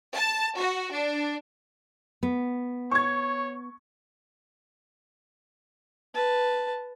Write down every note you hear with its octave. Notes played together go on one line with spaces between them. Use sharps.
A5
F#4
D4
B3
C#5 C#6 G#6
B4 A5